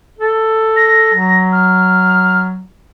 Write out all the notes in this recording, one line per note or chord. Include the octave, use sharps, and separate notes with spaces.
A4
A#6
F#3
F6